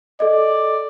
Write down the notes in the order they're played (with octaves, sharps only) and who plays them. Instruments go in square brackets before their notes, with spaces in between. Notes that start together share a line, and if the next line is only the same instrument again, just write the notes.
[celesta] A4 D#5 [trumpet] D5